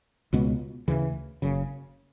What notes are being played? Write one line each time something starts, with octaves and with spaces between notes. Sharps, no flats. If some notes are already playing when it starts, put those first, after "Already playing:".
C#2 B2 G#3 B3
D2 C#3 E3
F#1 F#2 C#3